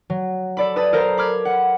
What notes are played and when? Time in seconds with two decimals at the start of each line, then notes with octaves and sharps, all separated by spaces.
0.10 F#3
0.57 A4 D5 B5
0.76 B4 A5 B5 D#6 A6
0.93 A4 A#4 C5 F5 A#5
1.17 B5 D6 F6 G#6
1.45 F#5